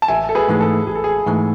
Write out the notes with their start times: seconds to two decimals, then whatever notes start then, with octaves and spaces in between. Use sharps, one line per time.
0.02 A5
0.08 A1 E5 G#5
0.29 A4
0.35 G#4 B4
0.48 G#2 E3 A3 G#4
0.61 A4
0.87 A1 G#4
0.95 A4
1.04 G#4
1.26 G#2 E3 A3